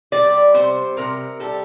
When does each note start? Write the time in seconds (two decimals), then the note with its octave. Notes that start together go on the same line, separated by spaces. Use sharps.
0.12 G3 D5
0.54 C3 C5
0.97 C3 A#4
1.40 G3 A4